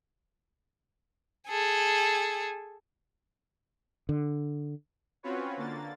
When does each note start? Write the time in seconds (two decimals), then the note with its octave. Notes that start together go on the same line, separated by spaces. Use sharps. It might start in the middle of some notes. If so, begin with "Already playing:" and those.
1.48 G#4 A4
4.09 D3
5.23 C4 C#4 F4 F#4 B4 C#5
5.57 D3 A#3 A6